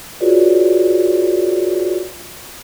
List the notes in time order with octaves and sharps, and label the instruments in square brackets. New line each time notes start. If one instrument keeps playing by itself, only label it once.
[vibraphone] F4 F#4 G#4 B4 C#5 D5